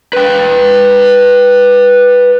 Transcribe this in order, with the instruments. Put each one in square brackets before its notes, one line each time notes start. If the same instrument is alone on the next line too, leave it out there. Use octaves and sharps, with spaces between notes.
[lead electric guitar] B4 G5